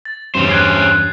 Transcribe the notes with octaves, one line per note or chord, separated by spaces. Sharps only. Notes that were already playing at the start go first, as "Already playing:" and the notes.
A6
E2 G2 C#4 G4 C5
F#6 G#6 C7